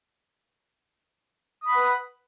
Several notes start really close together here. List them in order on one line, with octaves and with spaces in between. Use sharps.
D#6 B5 F#5 B4